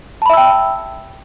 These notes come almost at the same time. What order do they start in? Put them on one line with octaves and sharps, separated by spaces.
A5 B5 E5 E6 G5